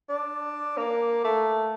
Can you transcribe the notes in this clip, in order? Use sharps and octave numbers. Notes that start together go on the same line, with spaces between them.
D4
A#3
A3